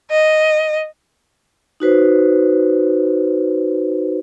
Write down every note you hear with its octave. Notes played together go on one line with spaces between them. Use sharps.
D#5
D#4 F#4 B4 C5